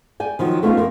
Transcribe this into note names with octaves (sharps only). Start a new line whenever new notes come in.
D5 G5 G#5
D#3 F3 F#3 F#4
C3 A3 B3 C#4 D#4 F4
F2 A#4